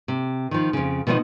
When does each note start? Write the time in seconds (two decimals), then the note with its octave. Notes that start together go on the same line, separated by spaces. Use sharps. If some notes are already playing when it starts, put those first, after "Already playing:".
0.08 C3
0.51 D#3 F3
0.73 F2 C#3
1.07 B2 D#3 F3 B3 D#5